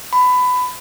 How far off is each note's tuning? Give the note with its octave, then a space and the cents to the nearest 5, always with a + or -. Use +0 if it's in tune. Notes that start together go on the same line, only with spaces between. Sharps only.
B5 +20